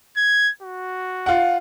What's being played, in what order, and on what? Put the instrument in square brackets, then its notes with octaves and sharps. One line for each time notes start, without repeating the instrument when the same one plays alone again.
[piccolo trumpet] G#6
F#4
[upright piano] F4 F#5